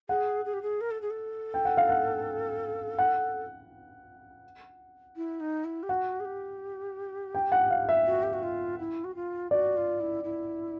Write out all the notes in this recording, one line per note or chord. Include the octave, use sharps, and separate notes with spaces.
G#4 F#5
G#4
G4
G#4
A#4
A4
G#4
A4
G5
F#5
F5
F#5
F#5
E4
D#4
E4
G4
F#4 F#5
G#4
G4
G5
F#5
F5
E5
F#4
G4
F#4
F4
E4
F#4
F4
F#4 D5
F4
E4
E4